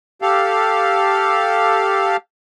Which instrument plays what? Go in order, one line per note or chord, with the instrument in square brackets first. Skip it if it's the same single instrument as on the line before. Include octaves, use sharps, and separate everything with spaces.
[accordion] G4 A4 F5